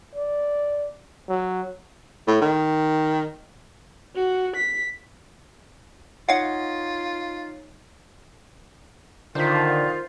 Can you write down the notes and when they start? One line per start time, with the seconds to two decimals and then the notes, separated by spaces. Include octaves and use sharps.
0.15 D5
1.29 F#3
2.27 A2
2.41 D#3
4.15 F#4
4.56 B6
6.29 D#4 F4 C#5 D#5 F5 F#5
9.35 D3 D#3 F4 C5 B6